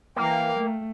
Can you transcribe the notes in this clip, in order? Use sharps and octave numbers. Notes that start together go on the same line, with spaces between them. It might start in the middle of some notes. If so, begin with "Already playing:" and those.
E3 A#3 F5 G5
A3